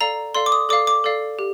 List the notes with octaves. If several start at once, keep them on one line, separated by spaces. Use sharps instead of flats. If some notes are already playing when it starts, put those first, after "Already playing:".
A4 D5 F5 A#5
A4 D5 F5 C6
D6
D#6
A4 D5 F5 D6
D6
A4 D5 F5
G4